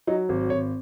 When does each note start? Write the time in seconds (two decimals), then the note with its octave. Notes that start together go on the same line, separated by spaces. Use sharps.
0.07 F#3 D#4
0.29 G#1
0.50 G#1 C#5